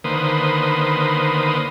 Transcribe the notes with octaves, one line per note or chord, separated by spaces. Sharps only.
D3 D#3 A#3 B4 C5 D#6